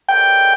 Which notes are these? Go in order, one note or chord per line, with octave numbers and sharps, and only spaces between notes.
G5